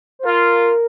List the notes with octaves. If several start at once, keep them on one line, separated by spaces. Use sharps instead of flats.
C5
F4 A#4